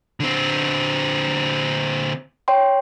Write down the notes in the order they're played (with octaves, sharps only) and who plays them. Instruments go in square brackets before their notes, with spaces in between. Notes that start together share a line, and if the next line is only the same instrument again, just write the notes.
[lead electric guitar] D3 C4
[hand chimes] C#5 G5 C6